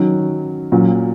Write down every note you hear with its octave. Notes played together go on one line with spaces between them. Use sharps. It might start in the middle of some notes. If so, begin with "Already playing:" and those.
Already playing: D#3 F#3 C#4
A#2 F#3 C#4